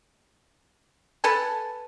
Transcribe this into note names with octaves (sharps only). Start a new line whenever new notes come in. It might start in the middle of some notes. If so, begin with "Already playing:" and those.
A4 B4 G#5 A5